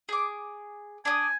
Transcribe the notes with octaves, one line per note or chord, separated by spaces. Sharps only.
G#4 D6
D4 G#5 D#6